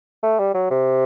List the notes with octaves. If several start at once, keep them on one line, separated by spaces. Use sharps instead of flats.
A3
G3
F#3
C3